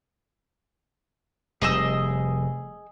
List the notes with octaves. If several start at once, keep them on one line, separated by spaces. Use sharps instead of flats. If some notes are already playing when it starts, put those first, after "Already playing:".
F1 G3 G#4 D#5 E6